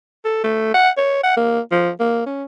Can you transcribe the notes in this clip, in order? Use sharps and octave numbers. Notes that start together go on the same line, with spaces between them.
A4
A3
F#5
C#5
F#5
A#3
F3
A#3
C#4